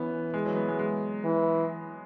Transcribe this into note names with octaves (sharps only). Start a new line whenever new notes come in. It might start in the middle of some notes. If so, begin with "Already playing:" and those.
Already playing: E3 B3 C#4
G#3
F#3
B3
G#3
G#3
E3